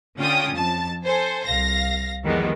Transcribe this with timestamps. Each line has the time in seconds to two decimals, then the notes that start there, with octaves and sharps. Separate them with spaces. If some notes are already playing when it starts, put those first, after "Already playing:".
0.18 D3 C#4 F4 G5 D#6
0.54 F2 A5
1.05 A4 C5 G#5
1.46 C2 F5 A#6
2.24 F2 D#3 E3 G3 G#3 B3